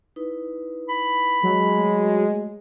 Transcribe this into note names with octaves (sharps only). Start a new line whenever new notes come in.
D#4 E4 B4
B5
F#3 G#3
A3